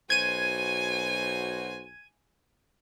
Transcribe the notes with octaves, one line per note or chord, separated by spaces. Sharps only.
B1 F#4 C5 G#5 G#6 D#7